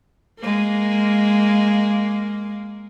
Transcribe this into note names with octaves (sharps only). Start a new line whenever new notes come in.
G#3 A#3